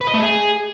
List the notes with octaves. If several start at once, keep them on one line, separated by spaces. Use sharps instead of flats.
B4
D#5
A3
G#4